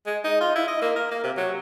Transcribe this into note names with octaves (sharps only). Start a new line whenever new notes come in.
G#3
D#4
F4
E4
D#5
A#3
A#4
A#3
C3
F#3